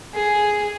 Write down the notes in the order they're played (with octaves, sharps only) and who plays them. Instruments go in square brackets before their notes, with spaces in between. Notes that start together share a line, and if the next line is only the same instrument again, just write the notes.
[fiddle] G#4